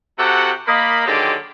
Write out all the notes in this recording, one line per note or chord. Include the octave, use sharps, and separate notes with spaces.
C3 F#4 G4 A4 F#5
A#3 D#5 B5
D3 D#3 F#3 G#3 G4